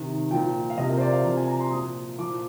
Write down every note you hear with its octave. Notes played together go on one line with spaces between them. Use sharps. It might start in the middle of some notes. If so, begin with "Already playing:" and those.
Already playing: C3 D#3
A#2 F3 G5
F5
C3 F3 D#5
A#4
C5
D5
F5
C3 F3
G#5
A#5
C6
A#2 F3 D#6
A#2 F3 D6